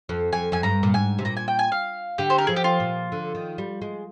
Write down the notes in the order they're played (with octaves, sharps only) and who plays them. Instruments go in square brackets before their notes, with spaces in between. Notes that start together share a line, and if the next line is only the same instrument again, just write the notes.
[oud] F2
[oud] F2 [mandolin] G#5
[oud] F2 [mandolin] G#5
[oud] G2 [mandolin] A#5
[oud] A#2
[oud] G#2 [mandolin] G#5
[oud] C3
[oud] A#2 [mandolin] A#5
[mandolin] G#5
G5
G#5
F5
[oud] D3 [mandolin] G4
[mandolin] C5
A#4
[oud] F3 [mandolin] G#4
[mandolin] G4
F4
[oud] A#2
D3
D#3
G3
G#3